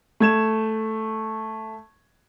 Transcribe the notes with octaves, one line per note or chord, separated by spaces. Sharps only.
A3 G#6 E7